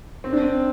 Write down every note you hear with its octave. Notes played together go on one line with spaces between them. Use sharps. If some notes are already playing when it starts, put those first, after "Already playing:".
C4
D4
C4